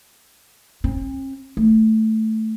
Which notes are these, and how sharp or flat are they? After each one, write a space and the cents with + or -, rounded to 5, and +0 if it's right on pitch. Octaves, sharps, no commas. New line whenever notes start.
C4 +45
A3 +0